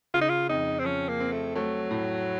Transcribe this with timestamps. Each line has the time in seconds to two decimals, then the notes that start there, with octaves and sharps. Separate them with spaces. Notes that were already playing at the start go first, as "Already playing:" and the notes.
0.14 C#3 F4
0.21 D#4
0.29 F4
0.49 F2 D#4
0.79 C4
0.84 F3 C#4
1.09 A#3
1.20 C4
1.32 A3
1.55 F#3 A3
1.91 A2